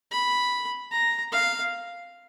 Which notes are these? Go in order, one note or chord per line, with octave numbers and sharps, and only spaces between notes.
B5
A#5
F5